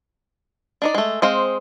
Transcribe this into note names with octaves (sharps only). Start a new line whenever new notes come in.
D4 D#4 D5
G#3 A3
G#3 C4 C5 F5